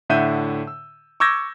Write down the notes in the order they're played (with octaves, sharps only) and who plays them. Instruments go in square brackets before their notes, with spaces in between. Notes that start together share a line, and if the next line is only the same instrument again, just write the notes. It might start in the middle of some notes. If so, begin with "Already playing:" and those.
[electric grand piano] A2 D3 E5 F#5 G6 D#7
E6
C#6 D6 E6 G6 G#6 A#6